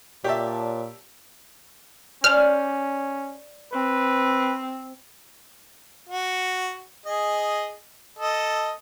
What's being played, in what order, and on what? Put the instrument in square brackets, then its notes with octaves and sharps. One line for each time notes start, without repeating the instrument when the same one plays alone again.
[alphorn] A#2 [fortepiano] G4 E5 [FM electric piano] C#5 D5 A5
[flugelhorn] C#4 [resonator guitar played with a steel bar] C5 D5 G#5 [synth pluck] F6
[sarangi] C4 [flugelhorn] B4
[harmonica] F#4
G#4 D#5
A4 D#5